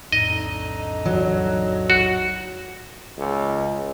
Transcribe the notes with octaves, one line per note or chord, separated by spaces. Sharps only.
B1 F2 A2 D3 D#4 D#5
F#3
F#4
C#2